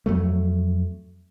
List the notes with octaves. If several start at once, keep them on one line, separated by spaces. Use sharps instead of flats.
F2 F#3 A3